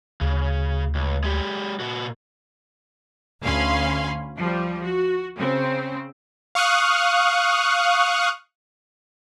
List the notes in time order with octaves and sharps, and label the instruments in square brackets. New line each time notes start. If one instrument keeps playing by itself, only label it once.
[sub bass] D2 [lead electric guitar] C#3
[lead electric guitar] C#2
G#3 G4
A#2 F#4
[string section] D2 C#4 F5 G#5 B5 C6
F3 G3
F#4
C#3 C4
[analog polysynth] F5 C#6 D#6 F6 F#6